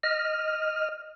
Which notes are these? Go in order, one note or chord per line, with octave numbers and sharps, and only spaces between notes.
D#5 F6